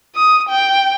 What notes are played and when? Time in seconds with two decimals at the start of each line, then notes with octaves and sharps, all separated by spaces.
0.15 D#6
0.48 G5